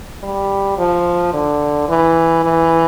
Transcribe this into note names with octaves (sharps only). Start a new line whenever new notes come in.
G3
F3
D3
E3
E3